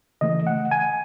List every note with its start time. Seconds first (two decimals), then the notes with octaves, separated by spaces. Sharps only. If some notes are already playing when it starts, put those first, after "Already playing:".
0.21 C#3 E3 A3 D#5
0.47 F#5
0.71 G#5